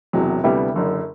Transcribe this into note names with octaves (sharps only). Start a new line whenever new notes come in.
E1 E2 C3 F#3
D2 C3 G3 B3 E4
F#1 F#2 D3